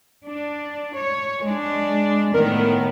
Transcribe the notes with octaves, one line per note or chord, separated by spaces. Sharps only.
D4
C#5
G#3 D4
A2 D#3 B3 A#4